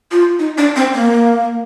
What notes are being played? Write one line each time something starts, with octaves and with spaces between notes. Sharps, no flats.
F4
D#4
D4
C4
A#3